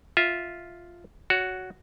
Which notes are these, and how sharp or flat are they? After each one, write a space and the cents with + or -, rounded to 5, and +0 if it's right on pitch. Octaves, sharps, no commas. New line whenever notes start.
F4 +0 E5 -10
F#4 +0 C#5 +25